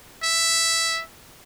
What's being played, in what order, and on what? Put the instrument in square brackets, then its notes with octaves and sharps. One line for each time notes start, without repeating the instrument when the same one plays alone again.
[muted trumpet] E5